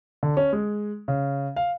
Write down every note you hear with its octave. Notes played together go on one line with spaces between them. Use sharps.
D3
C#4
G#3
C#3
F5